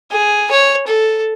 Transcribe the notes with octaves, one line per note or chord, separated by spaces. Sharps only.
G#4
C#5
A4